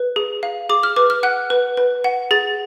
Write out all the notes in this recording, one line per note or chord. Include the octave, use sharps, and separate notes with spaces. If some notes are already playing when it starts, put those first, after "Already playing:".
Already playing: B4
G#4
F5
G#4 D6
F6
B4 D6
F6
F#5 F#6
B4
B4
F#5
G#4 A6